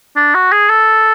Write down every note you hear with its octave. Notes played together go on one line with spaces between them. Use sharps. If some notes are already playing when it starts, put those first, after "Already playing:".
D4
F#4
G#4
A4